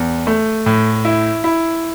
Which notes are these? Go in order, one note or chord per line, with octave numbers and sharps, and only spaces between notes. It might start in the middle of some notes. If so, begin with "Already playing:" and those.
Already playing: E2
A3
A2
E4
E4